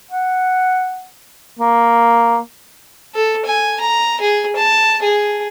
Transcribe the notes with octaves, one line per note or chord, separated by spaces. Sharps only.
F#5
A#3
A4
G#5
A#5
G#4
A5
G#4